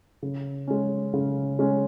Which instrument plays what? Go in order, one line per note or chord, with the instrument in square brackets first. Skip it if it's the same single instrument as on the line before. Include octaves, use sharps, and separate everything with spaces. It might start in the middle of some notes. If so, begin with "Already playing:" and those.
[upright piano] C#3
G#3 C#4
C#3
G#3 C#4